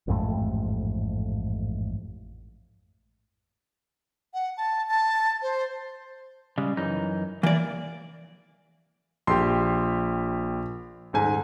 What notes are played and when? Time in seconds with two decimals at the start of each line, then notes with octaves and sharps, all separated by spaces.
0.08 A1 F2 G#2 A3
4.34 F#5
4.57 A5
4.88 A5
5.42 C5
6.58 C#3 G3 G#3
6.77 F#2 E3 D#4
7.43 E3 A#3 D5
9.27 A#1 G4 C6
11.13 D#1 G#2 G#5